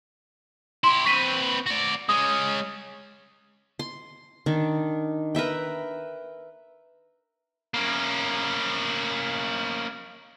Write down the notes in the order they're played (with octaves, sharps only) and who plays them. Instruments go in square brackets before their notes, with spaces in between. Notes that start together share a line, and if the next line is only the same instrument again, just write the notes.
[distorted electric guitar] E4 G4 [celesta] C6
[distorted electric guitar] C4 B4 [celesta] C#6 B6 D#7
[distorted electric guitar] F#4 D5
[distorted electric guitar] G#3 C#4 [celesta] D#6
[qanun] C6
D#3 D4
A#4 B4 E5 G5
[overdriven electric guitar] A#3 C#4